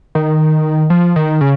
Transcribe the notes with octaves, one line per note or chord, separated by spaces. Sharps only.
D#3
F3
D#3
C#3